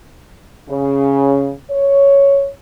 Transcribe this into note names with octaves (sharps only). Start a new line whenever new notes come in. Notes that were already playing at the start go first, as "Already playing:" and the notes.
C#3
C#5